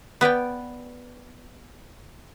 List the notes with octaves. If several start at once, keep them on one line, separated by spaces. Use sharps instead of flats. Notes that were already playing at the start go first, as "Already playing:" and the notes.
B3 B4 D5 G5